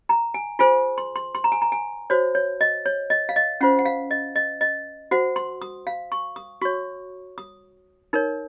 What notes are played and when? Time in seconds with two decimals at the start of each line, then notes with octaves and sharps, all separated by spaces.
0.09 A#5
0.34 G#5
0.59 F4 G#4 C5 G#5
0.98 C6
1.16 C6
1.35 C6
1.44 A#5
1.52 G#5
1.62 A#5
1.72 G#5
2.10 F#4 C5 C#5
2.35 C#5
2.61 D#5
2.86 C#5
3.10 D#5
3.29 F5
3.36 D#5
3.61 C#4 F4 C5 F#5
3.79 F#5
3.85 F5
4.11 D#5
4.36 D#5
4.61 D#5
5.11 F#4 C5 F#5
5.36 C6
5.62 D#6
5.87 F5
6.12 C#6
6.36 D#6
6.61 F#4 C#5 C#6
7.38 D#6
8.13 D#4 A#4 C#5